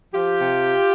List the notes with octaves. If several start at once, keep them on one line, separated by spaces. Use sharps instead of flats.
F3 F4 G4
C3